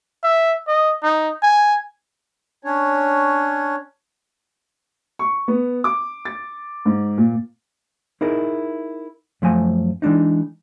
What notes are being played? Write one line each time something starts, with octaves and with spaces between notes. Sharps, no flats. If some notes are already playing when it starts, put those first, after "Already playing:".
E5
D#5
D#4
G#5
C#4 D4 C#5
C#6
B3
D6
A6
G#2
A#2
D#4 E4 G#4 A#4
F#2 F3 A3 G#5
E3 G#3 D4 D#4